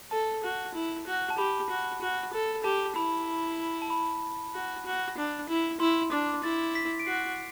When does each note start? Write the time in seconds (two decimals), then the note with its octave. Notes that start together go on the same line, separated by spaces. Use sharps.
0.11 A4 A5
0.44 F#4
0.74 E4
1.07 F#4
1.30 A5
1.38 G4 B5
1.70 F#4
2.01 F#4
2.33 A4
2.64 G4 A5
2.96 E4 B5
3.82 A5
3.90 B5
4.54 F#4
4.86 F#4
5.18 D4
5.49 E4
5.80 E4 C6
6.12 D4 D6
6.43 E4 A6
6.75 B6
7.00 D7
7.06 F#4 C7